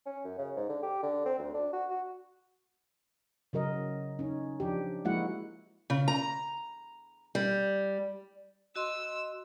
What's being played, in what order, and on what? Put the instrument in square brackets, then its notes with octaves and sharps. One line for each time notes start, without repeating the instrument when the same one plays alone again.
[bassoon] C#4
F#2
C#3
G#2
D3
G4
D3
C4
D2
D4
F#4
F#4
[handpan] C#3 F#3 A#4 D#5
C#4 D#4
F3 D4 G4
F3 G#3 A#3 E4 F#4 F#5
[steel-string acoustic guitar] C#3
A#5
G3
[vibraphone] F#4 D#5 C6 [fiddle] E6